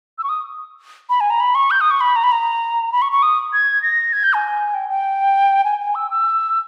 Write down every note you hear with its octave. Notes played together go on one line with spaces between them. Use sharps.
E6
C#6
D#6
B5
G#5
A#5
B5
C#6
G6
D#6
C#6
B5
A#5
B5
A#5
B5
C#6
C#6
D#6
G#6
A#6
G#6
G6
G#5
G5
G5
G#5
G#5
E6
E6